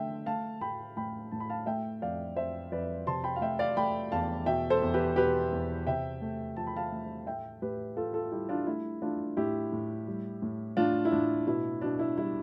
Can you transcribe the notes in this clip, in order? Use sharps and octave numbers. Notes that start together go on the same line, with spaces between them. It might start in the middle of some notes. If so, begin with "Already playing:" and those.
Already playing: D3 A3 E5 G5
A3 F5 A5
A2 G5 B5
A2 G5 B5
A2 A5
B5
F5 A5
A3 E5 G5
F2 D5 F5
F2 C5 E5
F2 B4 D5
C3 A5 C6
G5 B5
F5
A3 E5 G5
D5 F5
A3 G5 B5
E2 F5 A5
B2 E5 G5
A4 C5
E2
G4 B4
B2 G4 B4
E2
C3 E5 G5
A3
F3 A5
B5
F5 A5
A3
A2 E5 G5
A2 G4 B4
A2 F4 A4
F4 A4
G3 E4 G4
D4 F4
A3 E4
A3 D4 F4
A2 E4 G4
A2
G3
A2
A2 D4 F4
E4
A2 D4
B2 E4
B2 D4
E4
G3 E4